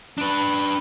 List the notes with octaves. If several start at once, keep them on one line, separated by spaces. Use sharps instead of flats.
D4 B4